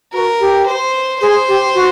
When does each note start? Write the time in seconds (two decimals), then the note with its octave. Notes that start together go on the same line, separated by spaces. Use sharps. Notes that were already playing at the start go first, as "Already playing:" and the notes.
0.13 F#4 A#4
0.40 G4
0.67 C5
1.20 G#4 C5
1.48 G4
1.75 F#4